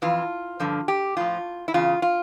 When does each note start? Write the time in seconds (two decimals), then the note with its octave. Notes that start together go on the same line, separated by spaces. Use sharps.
0.02 F2 E3 F4
0.60 G2 D3 F3
0.88 G4
1.17 A2 F3 F4
1.68 E4
1.74 E2 C#3 F4
2.02 F4